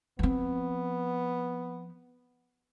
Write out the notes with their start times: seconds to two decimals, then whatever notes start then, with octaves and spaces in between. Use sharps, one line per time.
0.19 F3 B3 C4